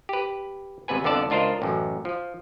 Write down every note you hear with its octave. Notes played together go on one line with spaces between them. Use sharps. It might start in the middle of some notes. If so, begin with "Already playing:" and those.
G4 B4
G#1 C3 B3 B4 G#5
C2 F2 D3 B3 D5 A5
C#2 D4 F4 A#4 C5 D#5
A1 F#2
F3